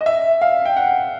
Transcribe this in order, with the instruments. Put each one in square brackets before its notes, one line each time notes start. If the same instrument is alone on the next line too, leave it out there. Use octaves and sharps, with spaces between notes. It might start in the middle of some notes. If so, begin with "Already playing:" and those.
[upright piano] D#5
E5
F5
G5
F#5